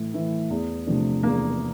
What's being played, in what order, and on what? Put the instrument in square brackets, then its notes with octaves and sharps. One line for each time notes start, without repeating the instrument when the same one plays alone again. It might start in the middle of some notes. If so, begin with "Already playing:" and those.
Already playing: [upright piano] A2 E3 A3 E4
E3 A3 E4
E2
C3 F3 A3 D4
[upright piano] E2 [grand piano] A#3